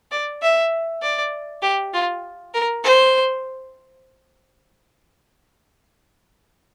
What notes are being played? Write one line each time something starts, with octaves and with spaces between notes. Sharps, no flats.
D5
E5
D5
G4
F4
A#4
C5